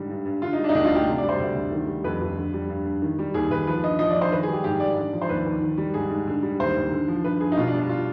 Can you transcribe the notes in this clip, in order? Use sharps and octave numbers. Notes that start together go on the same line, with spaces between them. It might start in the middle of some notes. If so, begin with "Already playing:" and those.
Already playing: G#2 D3 G3
G2
G2
D3 F4
D#4
G3
D4
D#4
D2 D4
F4
D2 G4
C3
D5
G3
C5
D2
D2
D#3
G3
F2 B4
F2
D3
G3
G2
G2
D#3
G3
D#2 G#4
D#2 B4
F3 B4
G2 D#5
F3 D#5
D5
G2
C5
D#3 B4
G#4
G3
G4
G#2 G4
G#2 D5
D3
F3
C5
D#2 B4
D#2
D#3
G3
G#2 G#4
G#2
D3
G3
D#2 C5
D#2
D3
F3
G2 B4
G2 G#4
D#4
B2 F4
D4
G3
D4
F4